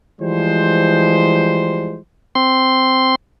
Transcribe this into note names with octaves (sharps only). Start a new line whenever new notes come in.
E3 F3 G3 G#3 C5
C4 C6